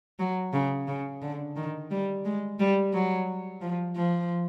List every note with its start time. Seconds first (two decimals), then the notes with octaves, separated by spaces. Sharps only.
0.19 F#3
0.53 C#3
0.88 C#3
1.22 D3
1.56 D#3
1.91 G3
2.25 G#3
2.59 G3
2.93 F#3
3.61 F3
3.96 F3